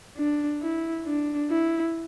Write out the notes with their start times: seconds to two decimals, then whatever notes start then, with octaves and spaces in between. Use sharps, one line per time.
0.17 D4
0.61 E4
1.07 D4
1.50 E4